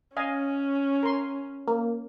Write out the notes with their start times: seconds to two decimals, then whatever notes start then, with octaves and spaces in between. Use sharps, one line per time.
0.17 C#4 D#5 F5 G#5
1.03 A#4 C6
1.68 A#3